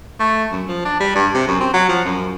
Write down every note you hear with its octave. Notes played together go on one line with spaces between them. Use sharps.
A3
F#2
F3
D4
G3
G2
C3
F#2
C4
F#3
F3
F#2